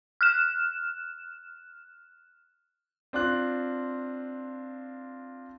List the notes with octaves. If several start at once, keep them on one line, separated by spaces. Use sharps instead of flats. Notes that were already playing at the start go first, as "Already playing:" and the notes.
F6 F#6 E7
C4 D4 F4 F#6